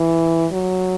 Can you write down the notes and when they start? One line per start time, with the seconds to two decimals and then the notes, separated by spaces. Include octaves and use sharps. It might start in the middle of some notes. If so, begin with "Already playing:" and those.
Already playing: E3
0.52 F#3